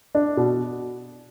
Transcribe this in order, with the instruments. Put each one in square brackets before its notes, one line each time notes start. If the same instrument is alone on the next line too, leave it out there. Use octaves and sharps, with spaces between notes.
[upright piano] D4
B2